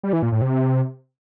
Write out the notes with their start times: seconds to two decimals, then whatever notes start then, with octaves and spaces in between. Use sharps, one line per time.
0.03 G3
0.13 E3
0.23 A#2
0.32 A2
0.42 C3